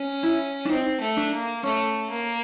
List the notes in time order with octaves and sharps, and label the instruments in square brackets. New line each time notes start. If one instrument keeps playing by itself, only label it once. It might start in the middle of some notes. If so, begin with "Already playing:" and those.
Already playing: [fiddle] C#4
[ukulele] E4
D4
[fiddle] C4 [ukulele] D#4
[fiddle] A3
[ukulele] D4
[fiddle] A#3
[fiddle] A3 [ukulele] C#4
[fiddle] A#3